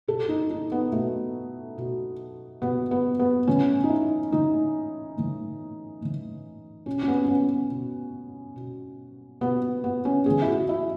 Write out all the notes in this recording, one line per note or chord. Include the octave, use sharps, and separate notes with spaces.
B2 A4
D#4
D#4
B3
B2 A3
B2
B2 B3
B3
B3
A2 E3 C#4
D#4
E4
A2 E3 D#4
A2 E3
A2 E3
B2 C#4
C#4
B3
C#4
B3
B2
B2
B2 B3
B3
C#4
A2 E3 G#4
E4
F#4
E4